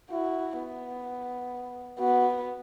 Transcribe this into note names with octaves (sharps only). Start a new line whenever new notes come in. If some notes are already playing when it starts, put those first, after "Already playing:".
E4 F#4
B3
B3 F#4